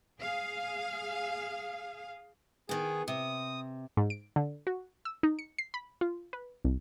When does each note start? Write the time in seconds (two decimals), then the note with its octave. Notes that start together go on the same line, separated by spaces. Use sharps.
0.19 G#4 F5
2.69 D#3 B3 G#4
3.08 C3 D#6
3.97 G#2
4.10 D7
4.36 D3
4.67 F#4
5.05 E6
5.23 D#4
5.39 C#7
5.59 C7
5.74 B5
6.01 F4
6.33 B4
6.65 C2